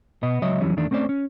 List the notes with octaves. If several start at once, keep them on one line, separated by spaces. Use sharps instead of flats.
B2 B3 D#5
C#2 F#3 C#5 D#5 E5
F2 E3 F#3 G3 C#4
E2 D#3 A3 D4
A3 C4 C#4 C5 D5
C#4